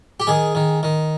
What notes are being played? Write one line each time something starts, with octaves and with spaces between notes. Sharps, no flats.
G4
D#3 G#4
D#3
D#3